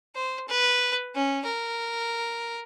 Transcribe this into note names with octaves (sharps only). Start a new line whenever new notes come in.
C5
B4
C#4
A#4